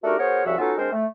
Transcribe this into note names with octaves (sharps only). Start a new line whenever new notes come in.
A3 D4 D#4 F#4 G4 A#4
B3 F#4 G#4 A#4 C5 C#5
C2 C#3 F3 F#4 E5
B3 C#4 D#4 F4 F#4 A4
G#3 C4 D4 A#4 C5
A3